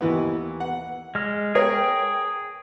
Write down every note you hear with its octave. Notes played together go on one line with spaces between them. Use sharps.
D#2 E3 B3
F#5
G#3 F6
G#4 A#4 C#5 G5